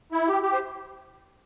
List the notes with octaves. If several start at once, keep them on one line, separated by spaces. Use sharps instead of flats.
E4
G4
G4
C5